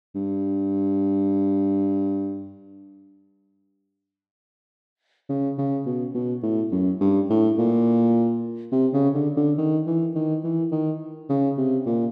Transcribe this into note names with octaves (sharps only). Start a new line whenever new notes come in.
G2
C#3
C#3
B2
B2
A2
F#2
G2
A2
A#2
C3
C#3
D3
D3
D#3
E3
D#3
E3
D#3
C#3
C3
A#2